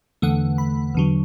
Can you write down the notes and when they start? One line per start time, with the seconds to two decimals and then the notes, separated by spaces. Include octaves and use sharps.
0.22 E2 D3 A3 F#5
0.58 B5
0.94 E2 D3 F#3